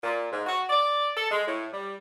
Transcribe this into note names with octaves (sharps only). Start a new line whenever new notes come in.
A#2
G#2
F#4
D5
A4
G#3
A2
G3